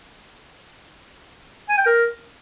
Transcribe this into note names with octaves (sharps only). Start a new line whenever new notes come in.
G#5
G5
A#4